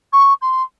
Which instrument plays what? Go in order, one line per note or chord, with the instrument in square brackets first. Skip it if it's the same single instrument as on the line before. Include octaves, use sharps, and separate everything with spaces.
[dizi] C#6
C6